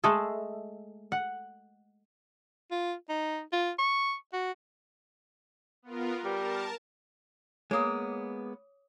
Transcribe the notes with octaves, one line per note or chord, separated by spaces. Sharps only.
G#3 A3 G#4 A4
F#5
F4
D#4
F4
C#6
F#4
B3 F4 A#4
G3 A#4 A5
G#3 A#3 B3 C#5 D6 D#6